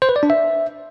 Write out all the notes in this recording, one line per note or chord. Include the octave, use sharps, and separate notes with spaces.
C5
B4
D5
D4
E5